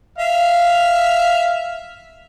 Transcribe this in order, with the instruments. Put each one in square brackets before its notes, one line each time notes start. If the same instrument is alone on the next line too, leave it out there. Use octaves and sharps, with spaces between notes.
[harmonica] E5 F5